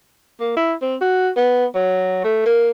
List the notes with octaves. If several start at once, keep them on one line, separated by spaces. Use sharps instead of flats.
A#3
E4
C4
F#4
B3
F#3
A3
A#3